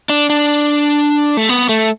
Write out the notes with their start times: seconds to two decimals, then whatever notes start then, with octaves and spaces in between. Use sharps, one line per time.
0.09 D4
0.30 D4
1.37 A3
1.49 B3
1.69 A3